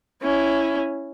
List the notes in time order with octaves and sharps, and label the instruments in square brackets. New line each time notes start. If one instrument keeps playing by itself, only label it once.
[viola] C#4 E4